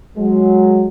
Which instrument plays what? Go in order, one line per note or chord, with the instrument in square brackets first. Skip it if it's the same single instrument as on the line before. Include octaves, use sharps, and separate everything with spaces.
[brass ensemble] F#3 G#3